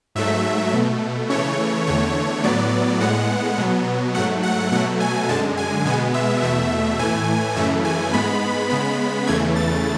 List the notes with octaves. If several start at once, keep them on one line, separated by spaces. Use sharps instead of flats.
G#2 F#3 A3 E5
B2 A3
C#3 E3 A3 C#5
E2 D3 A3 C#5
A2 F#3 B3 D5
A2 G#3 B3 F#5
B2 F#3 B3
G#2 F#3 A3 F#5
F#5
B2 F#3 A3 F#5
G#5
F#2 D3 G#3 A5
G#5
B2 G#3 B3 G#5
E5
E2 B2 A3 E5
A2 E3 A3 G#5
F#2 C#3 E3 A3 E5
G#5
G#2 G#3 B3 B5
C#3 G#3 B3 B5
E2 C#3 E3 A3 G#6
A6